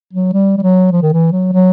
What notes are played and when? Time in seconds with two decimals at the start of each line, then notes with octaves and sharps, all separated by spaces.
0.13 F#3
0.33 G3
0.58 G3
0.62 F#3
0.92 F3
1.02 D#3
1.13 E3
1.32 F#3
1.53 F#3